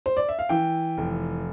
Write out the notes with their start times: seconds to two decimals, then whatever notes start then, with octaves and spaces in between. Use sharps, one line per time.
0.06 C5
0.17 D5
0.29 E5
0.39 F5
0.49 E3 G5
0.98 F1